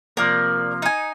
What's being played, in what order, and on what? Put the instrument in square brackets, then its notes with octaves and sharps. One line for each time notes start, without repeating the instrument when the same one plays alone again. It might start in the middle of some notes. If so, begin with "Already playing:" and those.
[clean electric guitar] C3 F3 A#3 [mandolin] A#4 D5
[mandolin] D#4 G#5